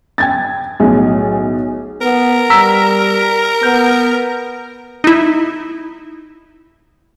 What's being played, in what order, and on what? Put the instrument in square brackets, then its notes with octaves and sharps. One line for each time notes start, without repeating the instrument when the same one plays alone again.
[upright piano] G5 G#6 A6
B1 A2 G#4
[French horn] B3 [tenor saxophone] A#4
[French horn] G3 [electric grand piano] A#5 E6 B6
[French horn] B3 [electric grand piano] G6
[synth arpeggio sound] D#4 E4